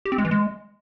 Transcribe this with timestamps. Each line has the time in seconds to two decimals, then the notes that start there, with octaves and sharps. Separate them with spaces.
0.05 G4
0.12 C4
0.18 G#3
0.25 E3
0.31 G#3